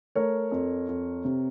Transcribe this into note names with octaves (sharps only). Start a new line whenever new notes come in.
A3 A#4 C#5
F2
F2
C3